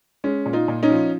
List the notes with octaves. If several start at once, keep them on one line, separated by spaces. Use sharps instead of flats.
G#3 C#4
A#2
D#4 F4
A#2
C#4 D#4
F3